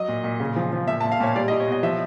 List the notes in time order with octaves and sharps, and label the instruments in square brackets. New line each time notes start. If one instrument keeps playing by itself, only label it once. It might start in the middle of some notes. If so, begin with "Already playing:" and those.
Already playing: [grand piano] F#3 D#5
A#2
A#2
C#3
F3
F3
A#2 E5
A5
A#2
F5
A#2 C#5
G3 D5
D#5
G3
C#5
B2 D#5
F3 E5